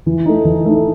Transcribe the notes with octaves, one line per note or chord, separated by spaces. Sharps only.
E3
A3 D#4
E3
A3 D#4